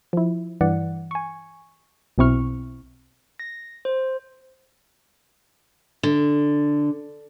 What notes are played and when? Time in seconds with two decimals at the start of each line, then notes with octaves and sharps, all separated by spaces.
0.13 F3 E4
0.61 G2 E3 D5 F#5
1.11 G#5 C#6
2.18 B1 B2 C4 E4 C#6 F6
3.39 A#6
3.85 C5
6.03 D3